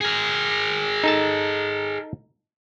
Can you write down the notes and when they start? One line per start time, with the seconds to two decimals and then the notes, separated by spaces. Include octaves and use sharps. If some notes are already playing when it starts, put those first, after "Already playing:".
0.01 G#4 A#4
1.04 D#4 A4 A5